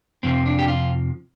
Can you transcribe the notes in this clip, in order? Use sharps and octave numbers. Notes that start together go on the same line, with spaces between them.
F2 C3 F3 C4
D4
G4
F4